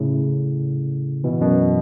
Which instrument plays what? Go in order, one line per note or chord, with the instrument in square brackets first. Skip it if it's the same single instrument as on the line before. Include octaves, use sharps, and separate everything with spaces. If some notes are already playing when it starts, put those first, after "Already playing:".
Already playing: [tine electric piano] A2 C#3
B2 E3
F#2 B2